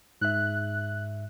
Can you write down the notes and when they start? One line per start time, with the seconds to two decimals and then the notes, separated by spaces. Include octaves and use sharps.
0.21 G#2 E5 F#6